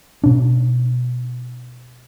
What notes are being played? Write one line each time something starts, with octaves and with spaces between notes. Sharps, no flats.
B2 D4